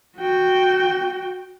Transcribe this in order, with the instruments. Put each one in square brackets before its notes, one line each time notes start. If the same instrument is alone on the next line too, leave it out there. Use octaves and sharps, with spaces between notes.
[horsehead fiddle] F#4 G5